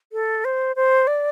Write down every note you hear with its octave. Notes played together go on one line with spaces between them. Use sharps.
A4
C5
C5
D5